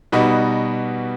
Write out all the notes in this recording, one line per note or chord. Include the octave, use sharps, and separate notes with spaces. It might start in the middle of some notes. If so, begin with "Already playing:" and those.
B2 G3 B3 D#4 F#4